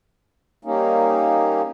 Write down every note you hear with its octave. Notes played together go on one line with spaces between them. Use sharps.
G3 A#3 C#4 D#4